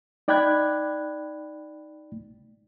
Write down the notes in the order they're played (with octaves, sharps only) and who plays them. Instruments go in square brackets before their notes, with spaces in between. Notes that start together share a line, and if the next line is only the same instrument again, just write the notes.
[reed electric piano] D#4 D5 G5 B5 F#6 G#6